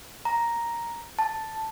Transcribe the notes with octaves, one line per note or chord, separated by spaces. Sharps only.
A#5
A5